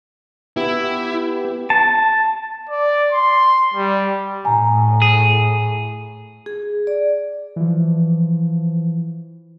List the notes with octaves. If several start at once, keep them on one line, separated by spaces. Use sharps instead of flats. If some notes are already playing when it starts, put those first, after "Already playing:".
B3 E4 G4
A5
D5
C6
G3
A2 G#5 A#5
G#4
G#4
D5
E3 F3